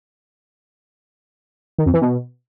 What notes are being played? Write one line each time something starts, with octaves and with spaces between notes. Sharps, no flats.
D#3
F2
E3
B2